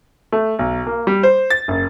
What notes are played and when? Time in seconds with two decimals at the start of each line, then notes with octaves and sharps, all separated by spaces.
0.32 A3
0.59 B1
0.87 A#3
1.07 G3
1.23 C5
1.50 A6
1.68 F#1